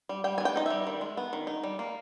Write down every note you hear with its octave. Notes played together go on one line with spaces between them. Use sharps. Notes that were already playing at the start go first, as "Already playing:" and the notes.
G3
G3 G5
G#5
B3 G5
D#4 D#5
G3 E5
D#3
G#3
B3
D#3
D#4
G3
A#3